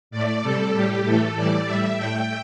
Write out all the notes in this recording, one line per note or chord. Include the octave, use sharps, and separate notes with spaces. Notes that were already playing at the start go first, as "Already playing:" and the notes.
A2 A3 D5
C3 G3 A4
A2 G3 G4
A2 E3 A3 A4
A2 E3 G3 D5
A2 G3 E5
A2 A3 G5